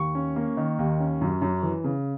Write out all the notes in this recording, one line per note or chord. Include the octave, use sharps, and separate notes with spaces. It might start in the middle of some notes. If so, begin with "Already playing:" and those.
Already playing: D#2 C#6
C#4
A#3
D#3
D#2
C#4
F#2
F#2
E3
C#3